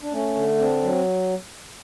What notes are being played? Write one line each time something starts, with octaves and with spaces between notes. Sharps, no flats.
D4
A3 C#4
D3
C4 D4
F#3